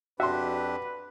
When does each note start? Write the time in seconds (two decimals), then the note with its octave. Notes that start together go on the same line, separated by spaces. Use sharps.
0.20 F2 D4 F#4 G4 B4 E5 C6